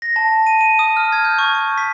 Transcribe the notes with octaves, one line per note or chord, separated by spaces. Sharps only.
A#6
A5
D#7
D#7
D#6
F6
G#6
G6
C#6
C#6
B6